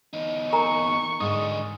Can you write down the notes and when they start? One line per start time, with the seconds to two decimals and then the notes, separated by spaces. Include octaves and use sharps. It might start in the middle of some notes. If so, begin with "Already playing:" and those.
0.13 E2 D#4
0.53 A#4 G#5 A#5 C#6
1.20 G#2 D3 D#4 D#6